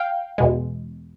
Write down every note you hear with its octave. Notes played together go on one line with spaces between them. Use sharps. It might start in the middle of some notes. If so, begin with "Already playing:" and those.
Already playing: F5 G5
E2 B2 G#3